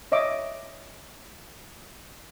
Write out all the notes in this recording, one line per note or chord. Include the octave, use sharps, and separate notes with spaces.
C#5 D#5 E5 D6